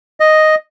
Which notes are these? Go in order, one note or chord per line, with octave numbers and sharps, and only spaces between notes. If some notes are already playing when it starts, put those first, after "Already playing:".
D#5